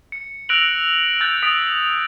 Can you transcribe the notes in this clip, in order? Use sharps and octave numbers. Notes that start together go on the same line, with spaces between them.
C#7
E6 F#6 A#6 D7 F7 F#7
E6 F#6 G6 A6 D7
D#6 A6 B6 D7 F7